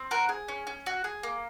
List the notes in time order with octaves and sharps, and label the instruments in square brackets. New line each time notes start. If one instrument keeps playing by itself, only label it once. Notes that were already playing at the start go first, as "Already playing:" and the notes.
Already playing: [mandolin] C4
F#4 A#4
G#4
C#4
C#4
F#4
G#4
A#3